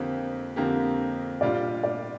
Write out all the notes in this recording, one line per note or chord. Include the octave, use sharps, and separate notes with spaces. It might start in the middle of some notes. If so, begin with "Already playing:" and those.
Already playing: F2 D3 A#3 G4 C5
F2 D3 A#3 G4
A#2 G3 D4 F4 D5
D5